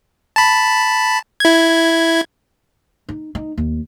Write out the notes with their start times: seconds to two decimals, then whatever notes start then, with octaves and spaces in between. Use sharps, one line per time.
0.36 A5 B5
1.40 E4 G#6
3.09 D#4
3.35 D#4
3.58 D#2